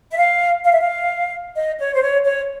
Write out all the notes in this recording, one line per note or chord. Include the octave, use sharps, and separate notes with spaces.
E5
F5
F5
E5
F5
D#5
C#5
C5
C#5
C#5